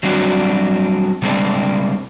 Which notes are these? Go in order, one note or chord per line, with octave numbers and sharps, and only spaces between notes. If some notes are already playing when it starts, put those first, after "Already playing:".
F#3 G3 C4 D4 F#4
C3 G3 G#3 C4 D4